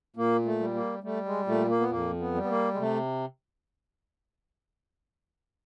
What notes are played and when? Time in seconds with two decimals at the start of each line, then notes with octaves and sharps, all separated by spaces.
0.16 A#2 A#3
0.45 A3
0.60 G3
0.74 A#3
1.03 G3 A3
1.25 G#3
1.47 A#2 A3
1.69 A#3
1.80 B3
1.91 F2 A#3
2.20 B3
2.35 G3
2.43 B3
2.49 A#3
2.73 G#3
2.78 C3 A3